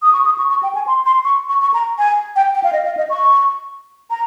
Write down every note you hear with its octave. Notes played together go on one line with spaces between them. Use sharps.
D#6
C#6
D#6
C#6
C#6
G5
G#5
C6
C6
C#6
C#6
C#6
A#5
G#5
G5
G5
F5
D#5
F5
D#5
C#6
A#5